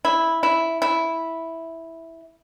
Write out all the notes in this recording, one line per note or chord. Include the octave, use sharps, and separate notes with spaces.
E4
E4
E4